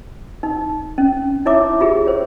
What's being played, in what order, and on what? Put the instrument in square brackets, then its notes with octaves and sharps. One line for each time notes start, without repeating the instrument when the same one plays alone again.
[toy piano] D#4
C#4
D#4 E4 C#5 E5 D6
F4 G4 G#4
C5 C#5